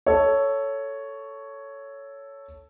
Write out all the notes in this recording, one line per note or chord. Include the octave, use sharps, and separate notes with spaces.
A4 C#5